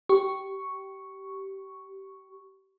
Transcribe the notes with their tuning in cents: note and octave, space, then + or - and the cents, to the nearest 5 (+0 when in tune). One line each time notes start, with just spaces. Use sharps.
G4 -20 C#6 +0